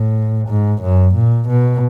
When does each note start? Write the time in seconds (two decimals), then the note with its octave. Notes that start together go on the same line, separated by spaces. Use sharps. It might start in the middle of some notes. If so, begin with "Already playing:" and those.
Already playing: A2
0.48 G#2
0.82 F#2
1.15 A#2
1.48 B2